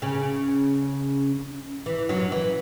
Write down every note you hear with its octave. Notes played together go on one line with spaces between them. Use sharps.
C#3 C#4
E3
F#2 F#3
E3